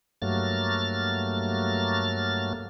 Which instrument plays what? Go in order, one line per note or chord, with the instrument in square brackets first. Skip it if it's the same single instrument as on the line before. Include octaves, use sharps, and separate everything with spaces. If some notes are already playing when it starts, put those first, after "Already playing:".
[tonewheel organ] G2 F#3 A3 A#3 F6 A6